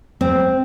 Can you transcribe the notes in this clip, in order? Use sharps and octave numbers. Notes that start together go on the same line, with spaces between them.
C4